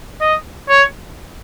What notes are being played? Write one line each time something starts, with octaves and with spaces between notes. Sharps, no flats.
D#5
C#5